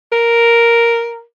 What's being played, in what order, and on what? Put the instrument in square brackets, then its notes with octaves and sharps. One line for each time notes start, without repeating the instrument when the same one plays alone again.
[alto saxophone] A#4